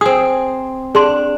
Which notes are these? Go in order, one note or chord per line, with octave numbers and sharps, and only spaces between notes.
C4 G#4 D#6
D4 G#4 C6